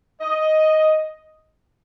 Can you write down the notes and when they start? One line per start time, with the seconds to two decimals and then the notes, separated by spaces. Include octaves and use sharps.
0.21 D#5